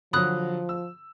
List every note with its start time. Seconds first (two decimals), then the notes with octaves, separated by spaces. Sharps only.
0.13 D3 F3 F#3 B5 D#6 F#6
0.69 E6